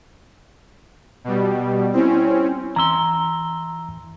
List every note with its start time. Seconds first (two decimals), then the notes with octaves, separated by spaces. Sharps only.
1.24 B2 G3
1.94 C4 C#4 E4
2.76 E3 A#5 C6 E6